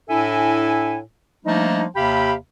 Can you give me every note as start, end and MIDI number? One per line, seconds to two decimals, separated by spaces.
0.09 0.99 45
0.09 0.99 62
0.09 0.99 64
0.09 0.99 69
0.09 0.99 76
0.09 0.99 80
1.45 1.85 53
1.45 1.85 55
1.45 1.85 57
1.45 1.85 58
1.45 1.85 62
1.45 1.85 63
1.96 2.34 39
1.96 2.34 48
1.96 2.34 67
1.96 2.34 77
1.96 2.34 79
1.96 2.34 83